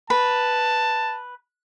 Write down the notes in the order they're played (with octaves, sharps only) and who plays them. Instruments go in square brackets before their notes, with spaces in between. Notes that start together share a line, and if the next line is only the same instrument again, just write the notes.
[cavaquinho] B4 [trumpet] A5